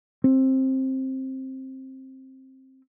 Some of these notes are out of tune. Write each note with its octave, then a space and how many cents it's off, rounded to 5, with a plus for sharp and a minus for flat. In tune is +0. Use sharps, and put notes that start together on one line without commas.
C4 +15